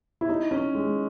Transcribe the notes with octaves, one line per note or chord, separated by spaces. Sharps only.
E4
D#4
C#4
G#3